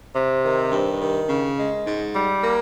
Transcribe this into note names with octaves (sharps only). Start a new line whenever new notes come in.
C3
D#3
G2
D#3
C#3
G#3
G#2
G3
A#3